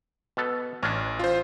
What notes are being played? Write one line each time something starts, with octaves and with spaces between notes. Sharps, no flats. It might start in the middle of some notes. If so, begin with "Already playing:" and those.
B2 B3 A4
A1 C#4 D4
F4 C5